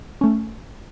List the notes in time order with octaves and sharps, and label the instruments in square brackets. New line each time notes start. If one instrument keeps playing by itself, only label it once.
[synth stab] A3 C#4